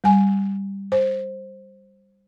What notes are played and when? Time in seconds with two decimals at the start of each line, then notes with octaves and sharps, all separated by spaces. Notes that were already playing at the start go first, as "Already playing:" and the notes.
0.04 G3 G#5
0.92 C5